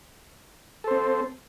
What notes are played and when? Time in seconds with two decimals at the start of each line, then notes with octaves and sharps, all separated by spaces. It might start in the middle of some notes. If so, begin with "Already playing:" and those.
0.84 A4
0.88 C5
0.91 C4